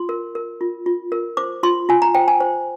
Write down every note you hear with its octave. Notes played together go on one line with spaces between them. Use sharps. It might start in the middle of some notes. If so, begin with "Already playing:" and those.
Already playing: F4 C6
A#4
A#4
F4
F4
A#4
C5 D6
F4 C6
F4 G#5
A#5
C5 G5
G#5
C5